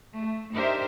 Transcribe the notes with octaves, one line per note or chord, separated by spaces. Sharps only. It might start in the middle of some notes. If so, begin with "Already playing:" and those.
A3
D4 D#4 G4 A#4 C5 E5